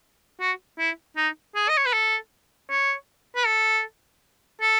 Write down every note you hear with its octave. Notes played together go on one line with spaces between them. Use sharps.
F#4
E4
D#4
G#4
D#5
C#5
B4
A4
C#5
B4
A4
A4